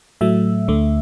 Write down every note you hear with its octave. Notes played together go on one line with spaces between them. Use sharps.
A2 F#3 A3 E5
D2 D3 A3